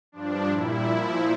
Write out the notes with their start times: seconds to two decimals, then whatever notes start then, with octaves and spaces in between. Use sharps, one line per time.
0.12 G2 F3 D4
0.48 A#2 G3 E4
0.83 A#2 F3